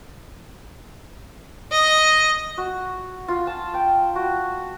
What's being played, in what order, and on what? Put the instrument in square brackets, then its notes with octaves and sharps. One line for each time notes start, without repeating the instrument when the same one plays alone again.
[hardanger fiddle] D#5
[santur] F#4
F4
A5
G5
F#4